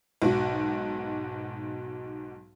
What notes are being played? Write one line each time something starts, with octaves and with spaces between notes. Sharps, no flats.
B1 G#2 F#4